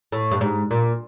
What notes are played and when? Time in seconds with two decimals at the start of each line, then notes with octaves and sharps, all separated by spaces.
0.12 A2
0.31 G2
0.41 G#2
0.71 A#2